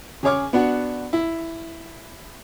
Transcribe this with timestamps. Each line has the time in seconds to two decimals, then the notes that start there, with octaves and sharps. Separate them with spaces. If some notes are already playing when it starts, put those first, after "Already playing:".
0.23 C#3 G#4 C#5 D6 F6
0.53 B3 D4 F#4
1.13 E4